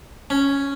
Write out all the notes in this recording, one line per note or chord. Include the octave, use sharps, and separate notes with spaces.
C#4